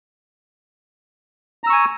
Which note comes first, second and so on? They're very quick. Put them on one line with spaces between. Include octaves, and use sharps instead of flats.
A#5 E6 C#6 G#5